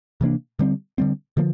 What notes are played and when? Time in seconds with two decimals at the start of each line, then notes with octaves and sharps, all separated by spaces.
0.21 C3 E3 A#3 D4
0.59 D3 G3 C4
0.98 D3 G3 C4
1.37 D3 F3 A#3